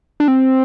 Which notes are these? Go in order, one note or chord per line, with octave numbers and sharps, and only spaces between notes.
D4
C4